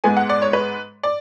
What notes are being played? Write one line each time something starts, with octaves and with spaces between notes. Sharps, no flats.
G#2 G#3 B3 G#5
F#5
D5
C#5
B4
D5